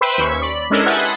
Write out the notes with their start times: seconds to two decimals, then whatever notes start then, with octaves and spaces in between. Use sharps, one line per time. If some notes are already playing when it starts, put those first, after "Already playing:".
0.01 B4 C5 E5 G5 B5 E6
0.18 D#2 C#4 C#6 B6
0.41 D5 B5
0.70 G#3 C#4 D4 E4 A4 A#4
0.86 G4 B4 E5 F#5 G#5 A5
0.98 A5 B5 C6 D#6